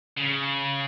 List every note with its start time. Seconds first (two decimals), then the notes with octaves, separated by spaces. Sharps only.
0.18 C#3